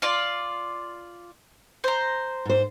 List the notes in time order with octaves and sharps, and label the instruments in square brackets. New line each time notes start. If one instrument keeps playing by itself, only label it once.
[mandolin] F4 D5
C5 A#5
[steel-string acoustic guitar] G#2 C5